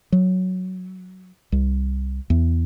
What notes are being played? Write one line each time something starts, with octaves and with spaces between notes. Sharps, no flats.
F#3
C2
E2